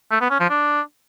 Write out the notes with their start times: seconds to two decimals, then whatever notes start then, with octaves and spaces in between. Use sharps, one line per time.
0.11 A3
0.21 B3
0.31 C#4
0.40 F3
0.50 D4